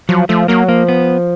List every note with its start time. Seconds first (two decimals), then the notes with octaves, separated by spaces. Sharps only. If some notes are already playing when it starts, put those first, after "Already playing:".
0.09 F3 F#3
0.29 F3 A3
0.48 F#3 A#3
0.69 F3 A#3
0.89 B3